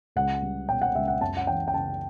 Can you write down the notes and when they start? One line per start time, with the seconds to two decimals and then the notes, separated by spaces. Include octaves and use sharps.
0.16 C#2 F#5
0.42 G3
0.69 B2 G5
0.82 F#5
0.95 C#2 E5
1.08 F#5
1.21 F#2 A5
1.37 F#5
1.47 E3 G5
1.68 G5
1.74 C#3 A5